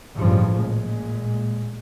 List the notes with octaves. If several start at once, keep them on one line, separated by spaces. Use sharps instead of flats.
A1 G2 C#3 F3 G3
A#2 G#3